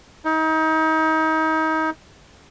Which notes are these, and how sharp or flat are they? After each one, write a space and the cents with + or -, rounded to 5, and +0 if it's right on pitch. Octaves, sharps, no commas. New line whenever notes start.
D#4 +30